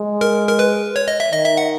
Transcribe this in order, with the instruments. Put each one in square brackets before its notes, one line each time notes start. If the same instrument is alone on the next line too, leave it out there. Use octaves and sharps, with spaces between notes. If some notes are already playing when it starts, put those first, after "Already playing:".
Already playing: [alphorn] G#3
[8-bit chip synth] A#4
A#4
B4
C#5
D#5
E5
[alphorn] D#3 [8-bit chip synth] D#5
[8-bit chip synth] E5
F#5